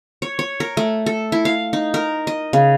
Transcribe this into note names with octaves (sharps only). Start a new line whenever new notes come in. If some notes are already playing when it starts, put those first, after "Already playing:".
C#5
C#5
A#4
A3
A4
E4
F5
D#4
A#4
D#5
C#3